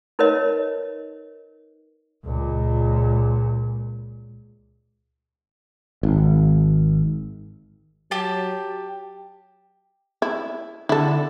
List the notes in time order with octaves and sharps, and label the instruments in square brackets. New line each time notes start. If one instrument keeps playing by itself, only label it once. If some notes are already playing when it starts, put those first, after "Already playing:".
[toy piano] D#4 A#4 B4 C#5 D#5
[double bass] C#2 A#2
[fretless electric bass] G#1
[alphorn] F#3 [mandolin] G4 A5
[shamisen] E4
[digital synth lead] D3 [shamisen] E4 A4